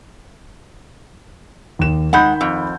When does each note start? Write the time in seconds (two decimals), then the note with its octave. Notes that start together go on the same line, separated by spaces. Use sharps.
1.79 D#2 E7
2.13 D#3 G#3 F#5 B5 G6
2.41 F2